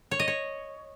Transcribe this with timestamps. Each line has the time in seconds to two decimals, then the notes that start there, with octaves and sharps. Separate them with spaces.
0.11 C#5
0.20 D#5
0.28 C#5